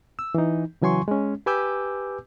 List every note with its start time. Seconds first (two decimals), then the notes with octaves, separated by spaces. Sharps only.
0.19 E6
0.35 E3 D#4
0.82 C#3 E3 F#3 G#5 C6 C#6
1.08 G#3 C#4
1.46 G4 B4 G#5 D6 E6 G6